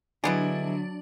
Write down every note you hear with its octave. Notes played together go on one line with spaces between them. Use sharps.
D3 F#3 G#3 B3 D4 E4